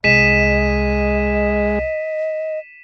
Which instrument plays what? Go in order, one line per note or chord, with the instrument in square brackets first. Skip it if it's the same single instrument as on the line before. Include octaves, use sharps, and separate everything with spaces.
[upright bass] C2 [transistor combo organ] G#3 [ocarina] D#5 [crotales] B6 D#7 E7